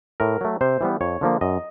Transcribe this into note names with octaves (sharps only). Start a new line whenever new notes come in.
A2 A#4
F#3 A3
C3 C5
E3 G3 B3
F2 C#5
D3 F3 A#3
F#2 D#5